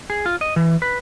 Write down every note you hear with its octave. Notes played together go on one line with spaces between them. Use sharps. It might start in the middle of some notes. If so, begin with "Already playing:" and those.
G#4
F4
D#5
E3
B4